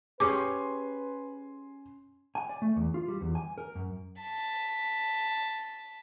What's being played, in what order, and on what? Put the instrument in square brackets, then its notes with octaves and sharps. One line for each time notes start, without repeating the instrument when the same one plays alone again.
[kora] C#4 G4 G#4 [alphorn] B4 [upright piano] G#5 C6 [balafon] D6
[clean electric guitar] G#5
D5
A3
E2
F4
G3
E2
G#5
A#4
F#2
[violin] A5 B6